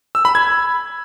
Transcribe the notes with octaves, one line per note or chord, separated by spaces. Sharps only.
E6
B5
G#6